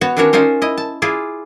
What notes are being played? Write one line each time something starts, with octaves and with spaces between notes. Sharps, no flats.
B3 F#4 C#5
D#3 C#4 D4 F#4 A#4 C#5
C#4 D#4 F4 A#4 C5
E4 D#5
A5
E4 F4 G#4 D5